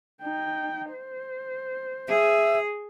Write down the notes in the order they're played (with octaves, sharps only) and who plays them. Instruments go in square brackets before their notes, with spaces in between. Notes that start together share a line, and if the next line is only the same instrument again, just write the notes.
[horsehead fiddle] D#4 G5
C5
[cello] G#4 [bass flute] E5